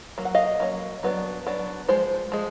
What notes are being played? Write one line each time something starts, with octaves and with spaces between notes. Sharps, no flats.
F#3 A#3
F#5
D#5 F5
F#3 A#3 C#4
F#3 B3 D4
F#3 B3 D4
F3 G#3 C5
F3 G#3